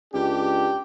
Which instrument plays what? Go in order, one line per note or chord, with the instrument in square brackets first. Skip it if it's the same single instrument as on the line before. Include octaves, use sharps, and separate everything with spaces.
[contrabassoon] C#2 [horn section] D4 G4